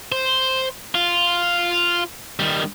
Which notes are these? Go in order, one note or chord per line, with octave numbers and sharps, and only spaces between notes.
C5
F4
D#3 G3